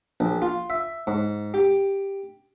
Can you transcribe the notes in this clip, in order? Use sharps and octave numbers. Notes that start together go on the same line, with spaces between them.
A#1
F4
E5
G#2
G4